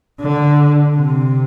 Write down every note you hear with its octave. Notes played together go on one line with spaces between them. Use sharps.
D3
C3